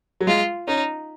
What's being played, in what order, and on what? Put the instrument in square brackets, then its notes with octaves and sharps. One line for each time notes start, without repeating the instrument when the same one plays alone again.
[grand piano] F#3
[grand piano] G#3 [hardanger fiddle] F4
[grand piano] C#4 [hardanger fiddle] D#4